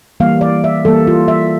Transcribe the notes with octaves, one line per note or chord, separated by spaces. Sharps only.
E3 G3 A#3 F5
D5
E5
E3 G3 A#3 A4
F4
E5